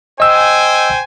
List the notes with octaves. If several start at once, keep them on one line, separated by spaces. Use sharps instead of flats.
C5 D#5 G5 G#5 E6